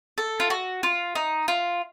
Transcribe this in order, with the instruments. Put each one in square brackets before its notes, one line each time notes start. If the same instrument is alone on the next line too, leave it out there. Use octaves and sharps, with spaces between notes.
[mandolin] A4
F4
F#4
F4
D#4
F4